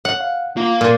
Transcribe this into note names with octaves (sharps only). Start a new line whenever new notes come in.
C#5 F#5
F5
A#3 F4 F5
A#2 A#4 C6